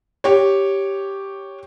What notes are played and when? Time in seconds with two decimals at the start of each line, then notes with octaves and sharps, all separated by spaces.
0.24 G4 C#5